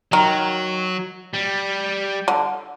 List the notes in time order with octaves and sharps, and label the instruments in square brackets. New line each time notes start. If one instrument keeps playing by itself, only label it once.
[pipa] D#3 [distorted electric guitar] F#3
[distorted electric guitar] G3
[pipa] D3